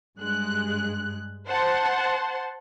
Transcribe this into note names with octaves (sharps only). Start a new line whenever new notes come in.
G2 G#3 F#6
C5 F#5 A5 C6